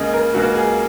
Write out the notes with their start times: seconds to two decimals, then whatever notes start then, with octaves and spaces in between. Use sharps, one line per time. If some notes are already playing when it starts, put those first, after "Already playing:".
Already playing: C#2 C#3 A#3 G#4 D#5
0.13 A#4
0.34 C#2 C#3 A#3 F#4
0.55 G#4